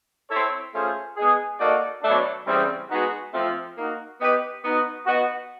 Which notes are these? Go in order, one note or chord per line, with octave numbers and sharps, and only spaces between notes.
C4 E4 A4 C#5
A3 C#4 F4 G#4 C5
G#3 B3 D#4 G#4
A#3 D#4 F#4 A4 D5
B2 F#3 A3 D4
C#3 E3 G3 C4
G#3 B3 D#4 F#4
F3 A3 C4 F4
A#3 D#4 F#4
B3 D#4 G4 B4
B3 D#4 F#4
B3 D#4 F#4